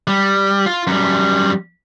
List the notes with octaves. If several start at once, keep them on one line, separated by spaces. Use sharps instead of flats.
G3
F4
F#2 G3